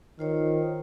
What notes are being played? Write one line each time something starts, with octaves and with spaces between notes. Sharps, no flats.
D#3 F4 C5 C#5